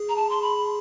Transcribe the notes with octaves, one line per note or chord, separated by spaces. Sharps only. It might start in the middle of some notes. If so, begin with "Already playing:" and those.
Already playing: G#4
A#5
A5
C6
B5